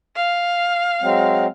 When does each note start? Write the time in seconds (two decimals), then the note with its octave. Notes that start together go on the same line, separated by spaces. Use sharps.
0.15 F5
1.02 F#3 G#3 C4